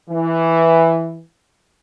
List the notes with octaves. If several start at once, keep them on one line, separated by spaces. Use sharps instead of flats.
E3